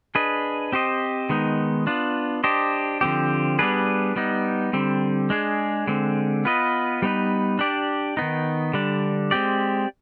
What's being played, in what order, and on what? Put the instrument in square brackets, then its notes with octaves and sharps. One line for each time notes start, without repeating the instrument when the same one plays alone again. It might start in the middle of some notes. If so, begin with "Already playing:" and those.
[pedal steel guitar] D4 G#4 B4 D#5
C4 G4 C5 D#5
D#3 G#3 B3 D#4
B3 D4 F4
D4 G4 C5 D#5
D3 F3 C4 G4
G3 B3 D4 G#4 B4
G3 B3 D#4
D3 G3 C4
G#3 D4 G#4
D3 G#3 C4
B3 F4 B4 D#5
G3 B3 D#4 B4
D4 G4 D5
D#3 B3 D#4
D3 G3 D4
G#3 C4 G4 D5